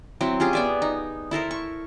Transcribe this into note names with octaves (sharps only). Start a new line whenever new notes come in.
F#3 C4 E4
C#4 F4 G4 G#4
B3 D5 E5
D#4
E4 A4 A#4 C5
C#6